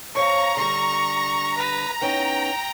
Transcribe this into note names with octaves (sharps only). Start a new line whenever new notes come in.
F2 C#5 F5 A#5 C#6
D3 G3 C#6
B4
B3 C#4 D#4 G5